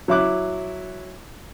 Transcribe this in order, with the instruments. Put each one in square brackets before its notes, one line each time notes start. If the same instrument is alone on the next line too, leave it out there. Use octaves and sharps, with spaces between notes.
[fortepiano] F#3 E4 D6 F#6